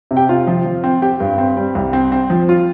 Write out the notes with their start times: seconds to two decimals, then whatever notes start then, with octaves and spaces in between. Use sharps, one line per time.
0.11 C3
0.17 G4 G5
0.29 C3 F4 F5
0.47 F3
0.65 F3
0.84 C4
1.02 C4 G4 G5
1.20 G2
1.38 C4
1.57 G3
1.75 C2
1.93 C4
2.12 C4
2.30 F3
2.49 F4